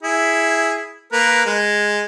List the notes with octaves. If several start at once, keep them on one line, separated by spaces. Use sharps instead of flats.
E4 G#4
A#3 A#4 B4
G#3